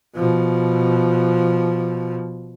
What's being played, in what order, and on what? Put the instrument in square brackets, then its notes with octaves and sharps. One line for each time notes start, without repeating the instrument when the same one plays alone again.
[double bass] B2 F3